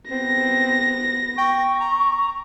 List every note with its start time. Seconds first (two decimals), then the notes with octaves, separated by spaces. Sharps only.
0.11 B3 C4 A#6
1.38 G5 C#6
1.80 A#5